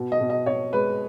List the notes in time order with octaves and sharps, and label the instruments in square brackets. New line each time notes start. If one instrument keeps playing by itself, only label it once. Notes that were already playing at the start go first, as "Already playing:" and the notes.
Already playing: [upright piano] B2
D#5
B2
D#5
B2 C#5
G#3 B4